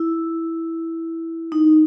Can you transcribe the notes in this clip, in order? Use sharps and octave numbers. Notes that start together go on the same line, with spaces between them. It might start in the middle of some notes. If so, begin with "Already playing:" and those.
Already playing: E4
D#4